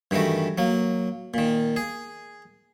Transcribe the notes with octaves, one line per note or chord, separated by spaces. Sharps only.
G2 D#3 E3 A3 F#4
F#3 A#3
A#2 D#3
G#4